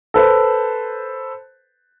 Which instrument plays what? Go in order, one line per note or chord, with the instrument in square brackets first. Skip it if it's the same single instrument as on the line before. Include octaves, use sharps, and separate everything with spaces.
[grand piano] A4 B4 C5